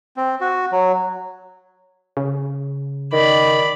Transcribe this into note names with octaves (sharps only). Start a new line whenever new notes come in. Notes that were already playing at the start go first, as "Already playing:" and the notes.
C4
F#4
F#3
C#3
D#3 D5 B5